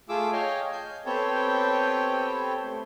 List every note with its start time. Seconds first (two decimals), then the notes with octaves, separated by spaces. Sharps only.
0.09 A3 F4 G#4 D6 E6
0.32 C#5 D#5 F5 G5 G#5
0.72 G#5 G6
1.06 B3 C4 G4 A4 C#5 G5
2.62 A3